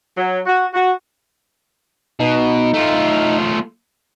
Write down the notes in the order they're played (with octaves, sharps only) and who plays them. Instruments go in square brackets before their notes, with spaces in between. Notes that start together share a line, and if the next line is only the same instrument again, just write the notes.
[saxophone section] F#3
F#4
F#4
[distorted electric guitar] B2 [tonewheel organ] D#4
[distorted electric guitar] A3 F4